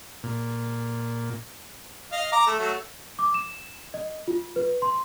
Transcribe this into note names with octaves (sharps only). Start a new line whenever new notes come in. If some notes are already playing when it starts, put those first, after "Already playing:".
A#2
D#5 F5
A#5 D6
A3
F#3 A3
D6
E7
D#5
F4
B4
C6